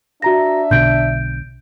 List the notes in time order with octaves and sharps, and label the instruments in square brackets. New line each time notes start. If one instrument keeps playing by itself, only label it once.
[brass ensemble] D4 E5 [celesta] F#4 A#5 A#6
[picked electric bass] B1 B2 D3 [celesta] G6 D7